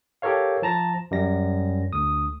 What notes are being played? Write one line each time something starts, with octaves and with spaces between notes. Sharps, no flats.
G4 A4 A#4 C#5 F5
F3 A5 A#5 A#6
F#2 G3 A#6
D2 D#6